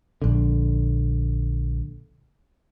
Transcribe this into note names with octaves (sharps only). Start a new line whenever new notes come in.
A#1 D3